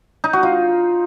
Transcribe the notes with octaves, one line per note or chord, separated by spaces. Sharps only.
D#4
F#4
F4